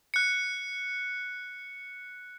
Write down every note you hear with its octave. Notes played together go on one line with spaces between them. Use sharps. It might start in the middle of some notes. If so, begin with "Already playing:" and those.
F#6 C#7